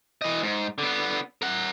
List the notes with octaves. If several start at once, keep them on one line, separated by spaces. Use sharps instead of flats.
E3 D#5
G#2
D3 B3
A#4 F#5